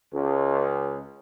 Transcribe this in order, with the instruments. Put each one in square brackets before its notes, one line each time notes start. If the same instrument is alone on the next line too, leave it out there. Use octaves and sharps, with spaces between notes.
[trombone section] C#2